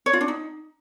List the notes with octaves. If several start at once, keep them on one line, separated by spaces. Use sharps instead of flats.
C#5
F4
D4
D#4